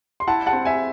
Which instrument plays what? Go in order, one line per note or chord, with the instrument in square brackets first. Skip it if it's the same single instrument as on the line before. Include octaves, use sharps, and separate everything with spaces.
[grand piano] C6
E4 F#5 A5
F#5 A5
C4
E5 G#5